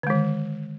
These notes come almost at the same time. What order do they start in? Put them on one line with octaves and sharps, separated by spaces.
D3 G#3 D#3